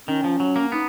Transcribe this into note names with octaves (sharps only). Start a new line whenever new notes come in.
D#3 C#4
F3
F#3
A#3
B3 D#4